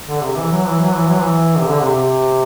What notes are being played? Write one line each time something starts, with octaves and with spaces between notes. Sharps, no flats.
D3
C3
E3
F#3
E3
F#3
E3
F#3
E3
C3
D3
C3
C3